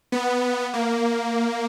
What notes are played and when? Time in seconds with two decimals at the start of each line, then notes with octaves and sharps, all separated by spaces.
0.12 B3
0.73 A#3